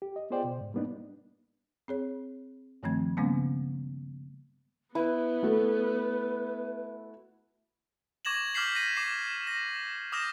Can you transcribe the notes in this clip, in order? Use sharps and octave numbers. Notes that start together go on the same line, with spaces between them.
G4
D#5
B3 F4 G#4 C5 D5 G5
B2
G#2
G3 A#3 B3 D4 D#4
C4 G#4 C#5
G2 D#3 F3 A3 C4 G#6
C#3 G3 G#3 A#3 B3 C#4
B3 E4 B4
A3 F#4 A4
C#6 D6 G#6 A#6 E7 F#7
D6 F6 G6 B6 C7 F#7
A#6 B6 D#7
D6 B6 C7 E7
A#6
D6 D#6 F6 G6 A#6 E7